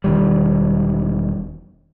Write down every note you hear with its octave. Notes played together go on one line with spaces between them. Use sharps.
E1 D#3 G3